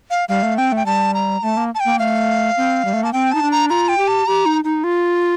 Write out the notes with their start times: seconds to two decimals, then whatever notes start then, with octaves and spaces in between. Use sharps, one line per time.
0.10 F5
0.29 G3 F5
0.43 A3
0.57 C4 G5
0.72 A3 G5
0.86 G3 A5
1.14 A#5
1.43 A3 A5
1.57 A#3
1.75 A5
1.80 G5
1.85 A#3
1.99 A3 F5
2.57 C4
2.85 G3
2.93 A3
3.03 A#3 A5
3.13 C4 G5
3.32 D#4 A5
3.42 D4
3.52 A#5
3.70 F4 A#5
3.89 G5
3.98 G4
4.08 A5
4.27 G4 A#5
4.46 D#4
4.64 D#4
4.84 F4